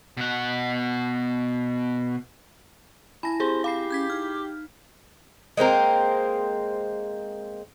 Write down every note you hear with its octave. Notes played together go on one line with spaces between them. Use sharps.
B2 F#5
E4 G#5 A5 B5 A#6
C4 G4 G#4 C5
G4 F5 B5 C7
C#4 G6 G#6 B6
D#4 F6
G#3 A#3 C4 A#4